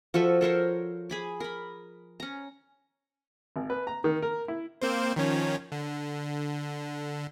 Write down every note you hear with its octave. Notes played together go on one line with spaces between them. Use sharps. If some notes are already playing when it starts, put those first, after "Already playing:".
F3 F#4 A4 E5
A4 A#4 C5 C#5
G#4 B5 D6
A#4 B5
C#4 A#5
G#1
B4
A#5
D#3
A#4
E4
A#3 C4 C5
D#3 F3 C#4
D3